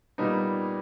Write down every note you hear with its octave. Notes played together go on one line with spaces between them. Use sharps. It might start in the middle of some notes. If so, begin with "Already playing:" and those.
A#2 G3 B3 D#4